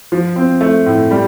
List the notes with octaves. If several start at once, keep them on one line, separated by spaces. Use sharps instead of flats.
F3
C4
A3
A2
G3